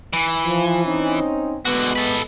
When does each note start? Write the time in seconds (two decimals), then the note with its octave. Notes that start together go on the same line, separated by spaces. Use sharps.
0.13 E3
0.44 F3
0.84 C4 C#4 D#4
1.65 D3 G#3 B3 F#4
1.96 A4 B4